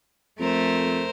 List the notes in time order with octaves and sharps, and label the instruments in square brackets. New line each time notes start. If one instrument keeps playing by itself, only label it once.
[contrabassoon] F2 [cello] A3 [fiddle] A#4 C5